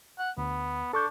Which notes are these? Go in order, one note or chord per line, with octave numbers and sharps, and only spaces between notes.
F#5
D2 B3
D4 A4 C#6 G6